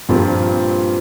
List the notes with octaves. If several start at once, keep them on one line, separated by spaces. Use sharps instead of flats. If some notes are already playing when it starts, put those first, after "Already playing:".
G2 A#2 F3 C4 F4 G4